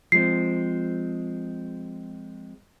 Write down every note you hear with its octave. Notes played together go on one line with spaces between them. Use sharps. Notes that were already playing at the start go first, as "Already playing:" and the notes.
F3 G#3 C4 C7